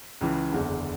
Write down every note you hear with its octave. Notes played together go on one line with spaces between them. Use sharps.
C#2 C#3 E3
F#1 E2 D3